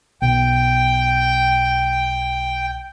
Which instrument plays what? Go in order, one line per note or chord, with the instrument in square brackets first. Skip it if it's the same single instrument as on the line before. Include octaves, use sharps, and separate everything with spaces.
[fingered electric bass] B1 [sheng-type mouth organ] G5